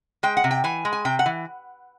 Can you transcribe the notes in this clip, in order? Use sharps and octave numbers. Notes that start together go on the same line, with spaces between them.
G#3 G5
F#5
C3
G5
E3 G#5
G#3
G#5
C3 G5
F#5
E3